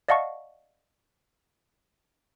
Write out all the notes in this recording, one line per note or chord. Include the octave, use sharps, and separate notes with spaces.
D5 D#5 F5 F#5 A5 C#6